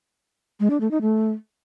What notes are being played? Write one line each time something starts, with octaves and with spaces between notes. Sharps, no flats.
G#3
D4
A3
D#4
A3